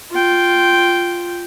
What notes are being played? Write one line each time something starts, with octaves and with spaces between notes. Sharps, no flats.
F4 G5